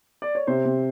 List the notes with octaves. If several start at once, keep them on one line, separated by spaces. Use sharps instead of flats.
D5
C#5
C3 C5
C3